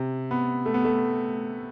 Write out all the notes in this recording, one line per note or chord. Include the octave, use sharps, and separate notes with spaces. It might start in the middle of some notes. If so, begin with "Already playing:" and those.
Already playing: C3
B3
A3
B3
A3